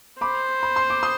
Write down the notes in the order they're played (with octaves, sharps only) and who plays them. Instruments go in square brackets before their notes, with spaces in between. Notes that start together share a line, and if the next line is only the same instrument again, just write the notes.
[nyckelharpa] C5 [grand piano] B5 D6
[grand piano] B5
C6
D6
C6 D#6